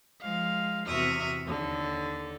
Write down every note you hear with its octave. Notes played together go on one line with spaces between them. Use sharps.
F3 G#3 F5
E2 C3 F#4 E5 D#6 F6
D#2 D3 A4